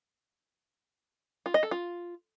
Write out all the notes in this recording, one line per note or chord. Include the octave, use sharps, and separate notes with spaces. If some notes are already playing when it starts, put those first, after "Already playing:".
F4
D#5
A4
F4